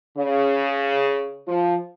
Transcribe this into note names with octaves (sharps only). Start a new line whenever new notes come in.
C#3
F3